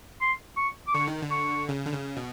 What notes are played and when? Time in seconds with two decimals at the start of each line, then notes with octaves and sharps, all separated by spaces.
0.21 C6
0.57 C#6
0.87 D6
0.94 D3 C#6
1.08 D#3
1.22 D3
1.31 C#6
1.69 C#3
1.86 D3
1.92 C#3
2.17 B2